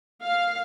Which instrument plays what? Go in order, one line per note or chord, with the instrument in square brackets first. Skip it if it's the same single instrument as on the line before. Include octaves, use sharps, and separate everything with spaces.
[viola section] F5